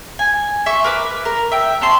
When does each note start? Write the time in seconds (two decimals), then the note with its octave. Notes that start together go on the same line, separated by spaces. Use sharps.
0.19 G#5
0.66 E5 C6 C#6
0.84 A#4 B4 D6
1.25 A#4
1.52 E5 G5
1.81 C#4 A5 C6